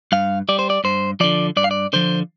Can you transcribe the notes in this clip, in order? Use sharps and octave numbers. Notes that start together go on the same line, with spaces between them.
G2 F5
G3 D5
C5
D5
G2 C5
D3 F3 D5
G2 D5
F5
D5
D3 F3 C5